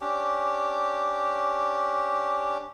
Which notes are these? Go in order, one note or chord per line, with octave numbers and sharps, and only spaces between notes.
C#4 D4 G4